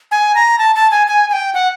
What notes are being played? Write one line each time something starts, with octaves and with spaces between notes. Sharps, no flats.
G#5
A#5
A5
A5
G#5
G#5
G#5
G5
F#5